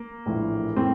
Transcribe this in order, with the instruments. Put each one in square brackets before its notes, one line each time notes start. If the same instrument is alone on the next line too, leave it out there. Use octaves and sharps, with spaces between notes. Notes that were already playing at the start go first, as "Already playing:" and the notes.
Already playing: [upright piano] A#3
A#1 A2 E3
A2 E3 C4